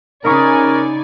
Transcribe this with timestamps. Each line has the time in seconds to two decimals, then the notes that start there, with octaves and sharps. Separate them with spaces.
0.24 C#3 D#4 A#4 D5 G#5 B5 C#6